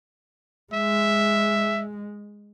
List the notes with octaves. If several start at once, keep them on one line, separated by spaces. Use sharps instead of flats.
G#3 E5